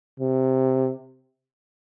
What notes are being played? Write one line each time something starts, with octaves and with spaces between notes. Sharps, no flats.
C3